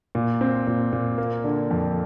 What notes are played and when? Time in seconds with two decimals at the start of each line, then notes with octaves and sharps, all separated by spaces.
0.15 A#2
0.41 C4
0.67 A#2
0.93 A#2
1.18 A#3
1.44 D3
1.71 F2